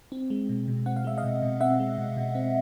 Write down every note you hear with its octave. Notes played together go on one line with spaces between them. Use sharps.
C4
G#3
B2
B2
C4 F#5
F5
G#3 E5
D#5 F5
B2
B2
C4 E5 F#5
G#3
B2
B2
C4